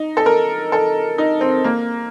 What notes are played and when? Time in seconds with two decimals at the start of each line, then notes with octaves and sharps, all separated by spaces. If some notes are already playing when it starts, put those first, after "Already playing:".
Already playing: D#4
0.17 A4
0.26 A#4
0.72 A4
1.18 D#4
1.41 C4
1.64 A#3